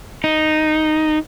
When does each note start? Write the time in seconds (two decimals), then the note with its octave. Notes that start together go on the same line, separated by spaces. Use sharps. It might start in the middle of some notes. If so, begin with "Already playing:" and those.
0.24 D#4